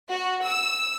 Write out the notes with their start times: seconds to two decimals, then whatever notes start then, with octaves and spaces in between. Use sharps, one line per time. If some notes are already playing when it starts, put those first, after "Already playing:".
0.10 F#4
0.45 E6